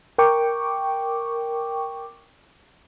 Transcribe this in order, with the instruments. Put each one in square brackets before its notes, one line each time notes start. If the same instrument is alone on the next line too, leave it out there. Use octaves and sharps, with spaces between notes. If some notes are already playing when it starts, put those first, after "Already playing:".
[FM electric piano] A#4 G5 C#6 D6